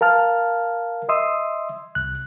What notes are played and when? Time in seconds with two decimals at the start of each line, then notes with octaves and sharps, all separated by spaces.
0.01 A#4 F5 A5 F6
1.09 D#5 E5 C6 D#6 E6
1.95 C2 F#6